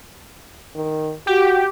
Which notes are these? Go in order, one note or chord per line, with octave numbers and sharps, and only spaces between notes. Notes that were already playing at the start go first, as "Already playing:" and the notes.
D#3
F#4 G4